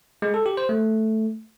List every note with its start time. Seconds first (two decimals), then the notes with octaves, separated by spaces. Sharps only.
0.22 G#3
0.34 A4
0.46 G4
0.57 C5
0.69 A3